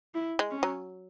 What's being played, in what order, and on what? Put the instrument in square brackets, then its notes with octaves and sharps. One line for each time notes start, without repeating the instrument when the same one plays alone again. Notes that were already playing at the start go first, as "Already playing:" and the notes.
[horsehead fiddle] E4
[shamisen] G#3
[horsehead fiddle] C#4
[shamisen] F#3